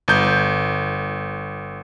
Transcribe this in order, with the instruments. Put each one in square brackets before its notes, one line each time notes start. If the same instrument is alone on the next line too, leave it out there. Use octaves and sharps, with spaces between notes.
[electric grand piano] G1 G6